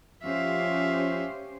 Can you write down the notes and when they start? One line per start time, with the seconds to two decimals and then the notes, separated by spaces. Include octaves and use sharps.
0.23 F3 C#4 G4 C5 E5 F5